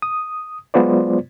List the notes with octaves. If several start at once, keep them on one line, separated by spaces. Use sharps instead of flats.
D#6
F#3 G#3 B3 F4 C5 D5